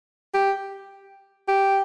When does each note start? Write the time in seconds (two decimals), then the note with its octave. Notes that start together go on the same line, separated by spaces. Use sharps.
0.34 G4
1.48 G4